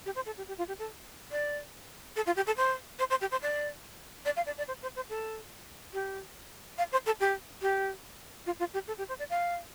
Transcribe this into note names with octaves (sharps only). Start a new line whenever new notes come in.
G4
C5
A4
G4
G4
F4
G4
A4
D5
A4
F4
G4
A4
C5
C5
C5
G4
C5
D5
D5
F5
D5
D5
C5
C5
C5
A4
G4
F5
C5
A4
G4
G4
F4
F4
G4
A4
G4
C5
D5
F5